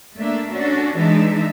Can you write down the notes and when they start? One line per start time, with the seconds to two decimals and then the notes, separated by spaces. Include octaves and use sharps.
0.18 A3 A#3 D4 E5
0.51 C#4 D4 F#4 A4
0.94 E3 G#3 D4 D#4 E5